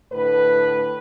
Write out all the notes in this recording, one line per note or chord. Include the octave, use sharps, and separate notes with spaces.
A2 D3 B4